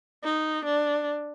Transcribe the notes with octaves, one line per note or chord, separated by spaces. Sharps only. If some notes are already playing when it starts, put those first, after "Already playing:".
D#4
D4